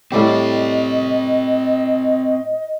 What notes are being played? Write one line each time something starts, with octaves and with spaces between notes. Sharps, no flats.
A2 G3 C4 G4 D5 D#5